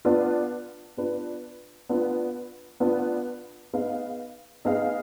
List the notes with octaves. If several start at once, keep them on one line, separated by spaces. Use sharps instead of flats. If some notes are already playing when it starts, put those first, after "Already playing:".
B3 D4 F4 B4
B3 D4 F4 B4
B3 D4 F4 B4
B3 D4 F4 B4
B3 D#4 G#4 B4 F5
B3 D#4 G#4 B4 F5